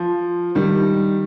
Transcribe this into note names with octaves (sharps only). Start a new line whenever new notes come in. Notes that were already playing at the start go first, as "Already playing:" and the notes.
Already playing: F3
D#3 G3